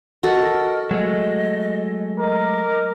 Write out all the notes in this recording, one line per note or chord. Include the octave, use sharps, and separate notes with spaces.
F#4 A4 A#4 D#5
F#3 G#3 A3 D#5
A#4 D#5 D6